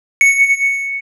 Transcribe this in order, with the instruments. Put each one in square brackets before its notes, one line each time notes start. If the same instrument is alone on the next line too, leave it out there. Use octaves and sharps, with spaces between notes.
[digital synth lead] C#7